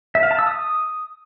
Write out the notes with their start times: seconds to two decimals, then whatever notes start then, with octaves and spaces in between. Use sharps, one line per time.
0.15 E5
0.23 F5
0.31 A5
0.39 E6
0.47 D#6